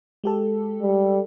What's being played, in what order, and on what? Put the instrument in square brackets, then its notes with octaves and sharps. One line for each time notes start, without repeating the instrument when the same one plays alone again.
[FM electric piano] G#3 G4 A4
[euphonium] G3